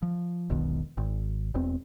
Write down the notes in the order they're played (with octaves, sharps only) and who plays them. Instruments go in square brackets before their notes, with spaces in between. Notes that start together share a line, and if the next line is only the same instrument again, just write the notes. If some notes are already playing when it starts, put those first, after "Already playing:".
[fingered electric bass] F3
E1 B1 B2 D#3
G#1
E1 E2 C4